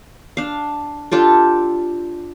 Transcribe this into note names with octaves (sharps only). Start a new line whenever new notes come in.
D4 F5
D4 F4 G4 A4